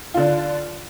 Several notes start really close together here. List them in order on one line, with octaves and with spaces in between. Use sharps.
F4 D3 D4